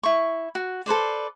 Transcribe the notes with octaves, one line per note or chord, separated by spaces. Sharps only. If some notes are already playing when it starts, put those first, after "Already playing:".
E4 C#6
F#4
A4 B4 C5 D5